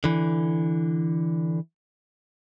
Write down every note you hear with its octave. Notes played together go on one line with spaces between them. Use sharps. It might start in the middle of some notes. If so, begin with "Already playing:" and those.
D3 E3